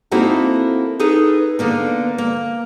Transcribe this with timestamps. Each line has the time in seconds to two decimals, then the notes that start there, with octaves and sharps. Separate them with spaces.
0.11 A#3 C4 D#4 E4 F#4 A4
0.99 D#4 G#4 A4 B4
1.59 D3 A#3 B3
2.18 A#3